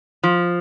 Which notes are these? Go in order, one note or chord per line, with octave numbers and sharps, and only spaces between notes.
F3